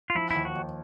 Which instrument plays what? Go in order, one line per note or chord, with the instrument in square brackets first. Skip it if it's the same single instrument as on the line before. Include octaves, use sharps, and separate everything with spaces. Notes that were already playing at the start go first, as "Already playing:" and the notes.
[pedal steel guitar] F4
[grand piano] F3 [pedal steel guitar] E4
[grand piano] D#2 [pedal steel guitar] E4
[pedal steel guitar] F#4
[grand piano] D#2